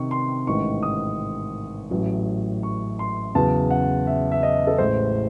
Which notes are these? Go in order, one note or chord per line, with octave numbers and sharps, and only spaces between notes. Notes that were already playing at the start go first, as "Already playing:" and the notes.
Already playing: C3 D#3 C#6
C6
A1 G#2 D#3 C#6
D#6
A1 A2 F#3
C#6
C6
E2 C#3 F#3 A5
F#5
E5
E5
D#5
A4
A1 A2 G#3 C5